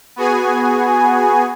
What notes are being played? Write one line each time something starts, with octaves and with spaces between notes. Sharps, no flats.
B3 F#4 G#4 G#5